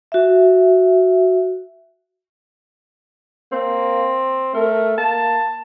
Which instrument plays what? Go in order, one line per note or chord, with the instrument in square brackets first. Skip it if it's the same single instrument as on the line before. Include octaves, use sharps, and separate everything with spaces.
[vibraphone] F#4 E5
[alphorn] A#3 [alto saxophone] C4
[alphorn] A3 [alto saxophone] A#4
[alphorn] A#3 [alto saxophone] A5